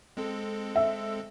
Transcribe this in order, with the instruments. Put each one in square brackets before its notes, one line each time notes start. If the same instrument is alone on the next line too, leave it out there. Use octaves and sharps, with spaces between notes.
[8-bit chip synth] G#3 C4 A4
[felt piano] E5